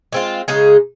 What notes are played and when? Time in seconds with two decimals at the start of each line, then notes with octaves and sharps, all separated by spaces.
0.13 G#3 C4 F4
0.48 C#3 G#3 D#4 G#4